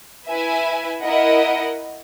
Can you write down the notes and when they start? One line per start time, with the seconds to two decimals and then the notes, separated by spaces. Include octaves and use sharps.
0.27 E4 B4 E5 G#5
1.01 E4 A#4 D#5 F#5